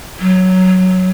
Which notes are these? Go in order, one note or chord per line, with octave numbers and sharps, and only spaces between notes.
F#3